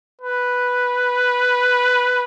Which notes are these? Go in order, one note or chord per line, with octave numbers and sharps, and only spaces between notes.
B4